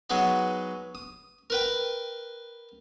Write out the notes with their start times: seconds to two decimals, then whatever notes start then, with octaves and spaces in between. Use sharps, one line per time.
0.10 F#3 G#3 B3 D#4
0.95 D#6
1.50 A#4 B4 G5